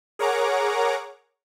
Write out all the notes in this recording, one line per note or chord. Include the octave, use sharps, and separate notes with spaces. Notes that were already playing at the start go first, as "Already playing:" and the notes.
G#4 A#4 C#5 F#5 A#5 D6